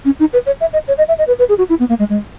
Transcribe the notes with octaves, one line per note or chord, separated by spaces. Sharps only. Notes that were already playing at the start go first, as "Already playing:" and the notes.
C#4
D#4
B4
C#5
E5
D#5
C#5
D#5
E5
D#5
B4
B4
G#4
F#4
E4
B3
A#3
G#3
G#3